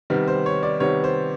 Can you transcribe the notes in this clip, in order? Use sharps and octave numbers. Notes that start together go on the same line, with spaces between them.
C3 D#3 G3 B3
C5
C#5
D5
C3 D#3 G3 B3 C#5
C5